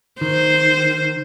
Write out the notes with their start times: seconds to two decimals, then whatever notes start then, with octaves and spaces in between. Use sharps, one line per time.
0.21 D#3 C5